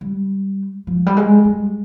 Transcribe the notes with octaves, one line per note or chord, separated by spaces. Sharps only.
G3
F3
G3
G#3
G3